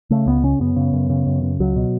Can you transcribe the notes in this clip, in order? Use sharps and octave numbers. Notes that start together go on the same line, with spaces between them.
C#3 A3
C#2 B3
C#3 C#4
F#2 B3
C#3
F#2
C#3
F#2
C#3
C#2 F#3
B2